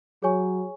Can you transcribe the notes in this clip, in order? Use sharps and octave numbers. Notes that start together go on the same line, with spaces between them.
F#3 G#4 C#5 G#5 C#6